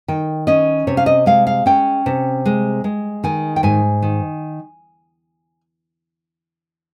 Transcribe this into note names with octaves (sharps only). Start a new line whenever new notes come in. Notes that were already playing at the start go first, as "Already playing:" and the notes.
D#3 G5
C#4 D#5
C3 C#5
F5
D#5
G#3 F5
F5
C#4 G5
C3
G#3
G#3
D#3 G#5
G5
G#2 G#5
D#3